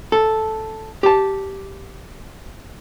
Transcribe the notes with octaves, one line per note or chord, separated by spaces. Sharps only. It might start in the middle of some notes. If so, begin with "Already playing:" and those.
A4
G4 A5